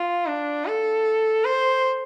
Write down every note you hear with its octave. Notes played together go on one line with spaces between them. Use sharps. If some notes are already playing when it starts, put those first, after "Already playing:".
Already playing: F4
D4
A4
C5